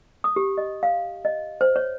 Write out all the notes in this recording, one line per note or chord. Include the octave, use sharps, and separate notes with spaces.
D#6
G4
D#5
F5
D#5
C5
C#5